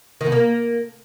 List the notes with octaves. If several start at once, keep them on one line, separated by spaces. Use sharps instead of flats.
D#3
B2
A#3